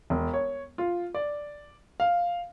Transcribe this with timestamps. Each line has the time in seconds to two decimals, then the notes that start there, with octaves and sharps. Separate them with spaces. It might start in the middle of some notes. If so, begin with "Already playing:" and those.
0.10 E1
0.34 C#5
0.78 F4
1.14 D5
2.00 F5